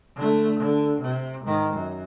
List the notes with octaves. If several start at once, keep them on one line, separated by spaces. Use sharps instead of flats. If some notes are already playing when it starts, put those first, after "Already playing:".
D3 A3
D3
C3
G#2 D#3
F#2